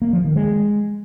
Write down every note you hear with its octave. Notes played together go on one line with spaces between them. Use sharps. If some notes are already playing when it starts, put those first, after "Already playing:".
A#3
F3
D#3
G#3